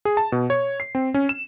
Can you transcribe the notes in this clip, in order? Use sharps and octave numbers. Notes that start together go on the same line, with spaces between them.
G#4
A5
B2
C#5
C7
C4
C#4
E7